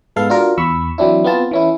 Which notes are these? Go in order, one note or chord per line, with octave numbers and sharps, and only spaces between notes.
G#2 G#3 B3 A4 F5
D4 F4 F#4 A#4
E2 B5 C#6 E6
E3 F#3 C4 D4 E4
B3 C4 F4 A5
E3 C#4 E4